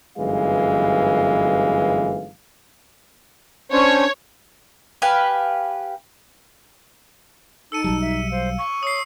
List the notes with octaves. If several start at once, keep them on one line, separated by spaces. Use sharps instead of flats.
G1 F#2 E3 G#3 F5
C#4 D4 C5 C#5
G4 B4 F5 G#5
D#4 A4 E6 C#7 D#7
B1 F#3 G3 A5
E5
C5 F5
C#6
C#5 D#6 C7